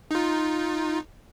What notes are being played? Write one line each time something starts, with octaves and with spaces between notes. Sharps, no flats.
D#4 F4